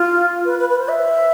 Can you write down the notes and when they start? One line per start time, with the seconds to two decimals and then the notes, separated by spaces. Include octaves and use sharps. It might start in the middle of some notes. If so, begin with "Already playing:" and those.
Already playing: F4
0.45 B4
0.59 B4
0.69 B4
0.79 C5
0.89 E5